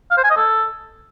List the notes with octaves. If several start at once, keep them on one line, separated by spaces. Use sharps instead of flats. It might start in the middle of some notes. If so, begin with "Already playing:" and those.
F5
C5
G#5
D#5
A4